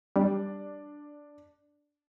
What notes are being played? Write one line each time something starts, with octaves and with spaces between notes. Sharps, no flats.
G3 D4